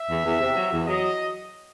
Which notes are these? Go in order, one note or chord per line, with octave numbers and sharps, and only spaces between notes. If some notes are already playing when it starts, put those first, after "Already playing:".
Already playing: E5
E2
E2
C3
F#3
E2
F#3 D#5